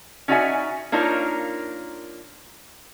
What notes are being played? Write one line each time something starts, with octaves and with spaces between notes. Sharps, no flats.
C#4 D#4 F#4 D5 E5 G#5
A#3 D4 D#4 F4 A#4 C#5